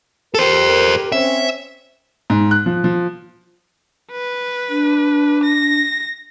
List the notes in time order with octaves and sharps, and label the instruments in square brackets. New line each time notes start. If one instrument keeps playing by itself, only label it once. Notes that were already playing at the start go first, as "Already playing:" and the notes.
[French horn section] G4 A#4 [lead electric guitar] A4 C5
[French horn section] C4 C#4 C5 [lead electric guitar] E5
[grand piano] G#2
F#6
F3
F3
[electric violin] B4
[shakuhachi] D4
[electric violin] A#6